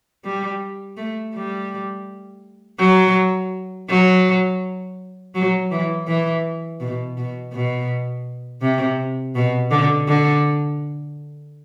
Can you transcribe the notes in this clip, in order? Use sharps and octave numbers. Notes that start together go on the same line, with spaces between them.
G3
A3
G3
F#3
F#3
F#3
E3
E3
B2
B2
B2
C3
B2
D3
D3